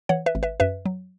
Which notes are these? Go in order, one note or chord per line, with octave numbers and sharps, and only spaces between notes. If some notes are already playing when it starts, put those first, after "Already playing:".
E3 C#5 F#5
B4 E5
G#1
B4 E5
F#2 B4 E5
F#3